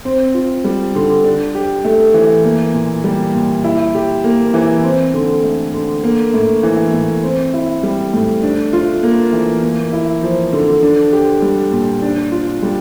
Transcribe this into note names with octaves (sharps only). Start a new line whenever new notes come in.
C4
F4
G3
D3
D4
G4
A3
E3
A#3
A#2
G3
A#2
E4
G4
A#3
E3
C4
D3
A3
D3
A#3
A2
E3
A2
C4
E4
G3
A2
D4
F4
A#3
E3
A#3
E4
F3
D3
D4
G4
G3
A#2
D4
F4
G3